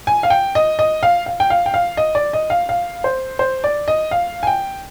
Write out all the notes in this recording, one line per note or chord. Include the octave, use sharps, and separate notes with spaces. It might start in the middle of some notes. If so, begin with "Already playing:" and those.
G#5
F5
G5
D#5
D#5
F5
F5
G5
F5
G5
F5
D#5
D5
D#5
F5
F5
C5
C5
D5
D#5
F5
G#5
G5